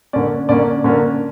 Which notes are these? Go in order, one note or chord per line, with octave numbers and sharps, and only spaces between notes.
D3 A#3 C#4 D5
D3 A#3 C#4 D5
D3 A#3 C#4